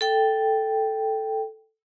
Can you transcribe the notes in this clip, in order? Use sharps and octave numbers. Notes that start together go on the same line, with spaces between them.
A4 G5